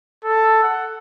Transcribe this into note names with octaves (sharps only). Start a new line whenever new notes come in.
A4
F#5